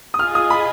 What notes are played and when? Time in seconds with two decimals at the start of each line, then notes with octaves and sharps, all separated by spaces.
0.14 D#6
0.19 F4 G#4 D#5 F6
0.35 D#6
0.50 B5